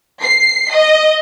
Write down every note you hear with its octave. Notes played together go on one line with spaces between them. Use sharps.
C7
D#5